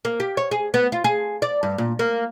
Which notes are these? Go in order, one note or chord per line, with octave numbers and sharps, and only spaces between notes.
A#3
G4
C#5
G#4
B3
F4
G#4
D5
G2
A#2
A#3